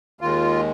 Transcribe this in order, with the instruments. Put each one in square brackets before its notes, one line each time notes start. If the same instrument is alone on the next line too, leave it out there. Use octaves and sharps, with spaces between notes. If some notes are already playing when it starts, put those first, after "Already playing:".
[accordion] D#2 D#3 G#3 F4